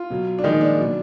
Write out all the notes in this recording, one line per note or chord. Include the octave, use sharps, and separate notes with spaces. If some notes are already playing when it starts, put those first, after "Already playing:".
Already playing: F4
B2 F#3
D4
A#2 D#3 F3 G#3 D#4
D4
B2 F#3